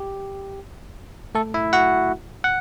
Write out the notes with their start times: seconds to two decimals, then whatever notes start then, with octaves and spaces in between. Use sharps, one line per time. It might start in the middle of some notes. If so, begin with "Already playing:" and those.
Already playing: G4
1.35 A3 A4
1.54 E4 E5
1.73 F#4 F#5
2.44 F#5